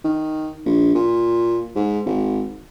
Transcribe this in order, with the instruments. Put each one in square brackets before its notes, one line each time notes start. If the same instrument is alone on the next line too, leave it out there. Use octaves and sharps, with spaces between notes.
[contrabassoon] D#3
A#1
A#2
G#2
G#1